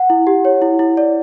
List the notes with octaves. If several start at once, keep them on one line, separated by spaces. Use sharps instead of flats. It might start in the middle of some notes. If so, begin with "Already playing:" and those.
Already playing: F#5
E4
G4
C#5
E4
E4
D5